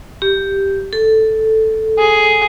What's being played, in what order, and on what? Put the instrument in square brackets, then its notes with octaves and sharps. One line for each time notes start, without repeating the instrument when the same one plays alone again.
[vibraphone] G4
A4
[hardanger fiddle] G#4